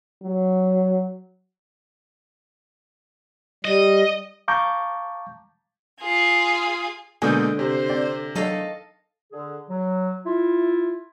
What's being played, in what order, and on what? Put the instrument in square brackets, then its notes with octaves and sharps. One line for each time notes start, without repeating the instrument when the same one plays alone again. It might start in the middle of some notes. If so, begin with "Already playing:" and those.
[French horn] F#3
[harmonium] G3 [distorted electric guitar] D#5
[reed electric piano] F5 A5 A#5 C#6 D6 G6
[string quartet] F4 G#4
[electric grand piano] B2 G#3 A#3 [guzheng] D3 [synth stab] G#5 D#6 G6
[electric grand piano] C3 [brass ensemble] C5
[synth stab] C4 D5
[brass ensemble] E2 D#3 A3 [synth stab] F#3 D4 [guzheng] A4 D#5 F5
[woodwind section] D3 G#4
F#3
E4 F4